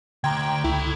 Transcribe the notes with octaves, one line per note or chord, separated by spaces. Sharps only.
D2 G5 A#5 C6 G#6
C#2 E4 A4 G5